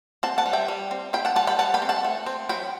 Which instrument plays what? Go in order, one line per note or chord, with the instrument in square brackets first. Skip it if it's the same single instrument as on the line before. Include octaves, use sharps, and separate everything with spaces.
[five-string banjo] C4 F#5 A5
F#5 A5
G3
E5 G5
G3
C4
C4 G5 B5
F#5 A5
G3 F#5 A5
G5 B5
G3 F#5 A5
G5 B5
C4
F#5 A5
A3
C4
F#3 G5 B5